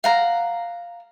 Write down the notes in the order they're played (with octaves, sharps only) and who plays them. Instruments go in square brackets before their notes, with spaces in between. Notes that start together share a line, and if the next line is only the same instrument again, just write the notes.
[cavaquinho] F5 F#5 A#5